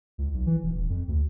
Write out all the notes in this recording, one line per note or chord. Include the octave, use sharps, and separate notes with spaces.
C#2
B1
E3
E1
D#1
F2
D2